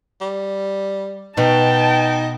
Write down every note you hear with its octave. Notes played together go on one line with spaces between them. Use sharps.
G3
B2 D#4 G5 A5